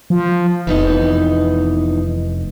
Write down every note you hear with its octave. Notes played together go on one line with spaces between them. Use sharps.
F3
F1 E3 B3 D#4